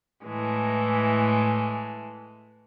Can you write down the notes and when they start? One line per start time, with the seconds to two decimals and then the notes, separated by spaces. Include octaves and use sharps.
0.25 A2 E3 G#3 A3